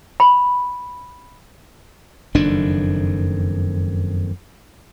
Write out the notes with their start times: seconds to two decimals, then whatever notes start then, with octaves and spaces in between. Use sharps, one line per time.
0.20 B5
2.35 F#1 F2 D#3 D4